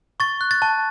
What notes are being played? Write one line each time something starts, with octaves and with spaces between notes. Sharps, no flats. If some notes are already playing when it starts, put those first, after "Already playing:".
C#6 A6
F#6
A6
A5